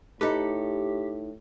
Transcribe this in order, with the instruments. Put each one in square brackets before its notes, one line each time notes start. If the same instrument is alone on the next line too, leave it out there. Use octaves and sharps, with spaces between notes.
[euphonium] A2 [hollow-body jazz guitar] D#4 A4 B4 [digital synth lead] G4